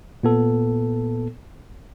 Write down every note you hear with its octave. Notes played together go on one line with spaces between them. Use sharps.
A#2 B3 A4